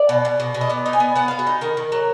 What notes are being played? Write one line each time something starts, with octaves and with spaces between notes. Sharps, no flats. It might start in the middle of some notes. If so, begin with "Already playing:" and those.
Already playing: D5
B2
B2
B2
B2
D#5
B3 D5
D#4
G#5
B3
B3 F#5
B3 F5
F#4
D#4
D#3 A#4
D#3
F#3